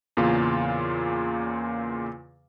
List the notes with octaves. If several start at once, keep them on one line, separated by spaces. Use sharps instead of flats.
E2 A#2 C#3 F4